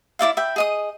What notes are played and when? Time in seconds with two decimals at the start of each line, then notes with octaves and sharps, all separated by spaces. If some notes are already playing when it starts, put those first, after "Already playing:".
0.19 E4 D5 E5 F5
0.37 E5 G5 B5
0.56 G#4 D#5 D#6